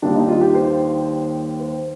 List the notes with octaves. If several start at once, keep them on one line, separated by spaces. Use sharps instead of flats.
D#2 D#3 G3 D4
D#4
F4
G4
C5
C5